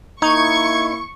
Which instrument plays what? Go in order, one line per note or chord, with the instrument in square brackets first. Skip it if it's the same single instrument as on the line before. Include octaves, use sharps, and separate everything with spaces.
[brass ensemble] A#3 E4 [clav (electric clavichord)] D#4 [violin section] C#6 [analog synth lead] G#6